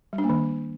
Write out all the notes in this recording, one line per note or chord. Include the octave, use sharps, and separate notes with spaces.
G3
D4
A#3
D#3